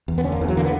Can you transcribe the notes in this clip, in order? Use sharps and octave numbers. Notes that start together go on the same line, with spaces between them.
E2
B3
D3 C#4
A#3
E2 E3
F#3
D3 A#3
B3